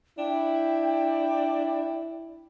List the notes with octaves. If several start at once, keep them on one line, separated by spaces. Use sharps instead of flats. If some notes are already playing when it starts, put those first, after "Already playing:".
D4 E4 G5